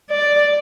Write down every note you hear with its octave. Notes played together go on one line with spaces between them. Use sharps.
D5